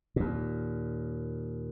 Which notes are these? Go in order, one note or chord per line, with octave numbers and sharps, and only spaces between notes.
D#2 A#2